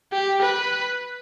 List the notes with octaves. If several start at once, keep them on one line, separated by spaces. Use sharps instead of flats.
G4
B4